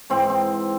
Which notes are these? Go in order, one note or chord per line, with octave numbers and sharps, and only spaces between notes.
G#2 E3 C4
C4